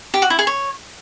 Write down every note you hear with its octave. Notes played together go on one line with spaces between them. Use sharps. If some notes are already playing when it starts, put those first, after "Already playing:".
G4
F#4
E4
G#4
C#5